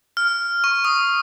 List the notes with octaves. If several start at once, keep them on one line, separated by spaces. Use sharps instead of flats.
F6
C#6
D#6